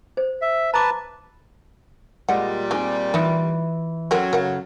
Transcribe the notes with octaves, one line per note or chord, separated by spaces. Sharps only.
C5
E5
B4 A5 A#5 D6
A#2 G3 G#3 D#5 F#5
G#3 C4 D#4 G4 G#5
E3 D#4 F4
F#2 F#3 C4 A4 A#4
C#3 A4 A#4 F#5